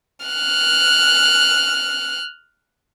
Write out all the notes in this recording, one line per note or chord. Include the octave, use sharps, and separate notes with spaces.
F6 F#6